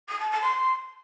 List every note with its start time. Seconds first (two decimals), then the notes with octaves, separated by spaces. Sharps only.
0.08 D#6
0.19 A5
0.30 A5
0.41 C6